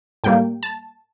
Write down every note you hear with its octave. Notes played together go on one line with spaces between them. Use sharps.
A2 G3 A#3 G5
A5